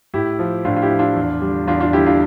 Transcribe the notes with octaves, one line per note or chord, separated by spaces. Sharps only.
A2 E4 G4
F3
A2 D4 F4
F4
E4 G4
F3
D4 F4
E2
D3 G3
E2 D4 F4
D4 F4
D3 G3 E4 G4
D4 F4